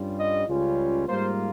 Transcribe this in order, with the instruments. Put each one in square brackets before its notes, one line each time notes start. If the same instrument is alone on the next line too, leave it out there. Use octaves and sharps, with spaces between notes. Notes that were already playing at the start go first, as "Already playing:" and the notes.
Already playing: [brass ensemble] G2 G3 C#4 F4
D#5
C#2 C#3 G3 C#4 F4
G#2 G3 A#3 F4 C5